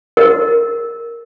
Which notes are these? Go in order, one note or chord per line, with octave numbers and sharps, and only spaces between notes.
A#4